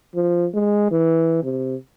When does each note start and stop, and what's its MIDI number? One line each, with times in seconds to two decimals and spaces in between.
0.15 0.46 53
0.54 0.87 56
0.91 1.39 52
1.43 1.75 48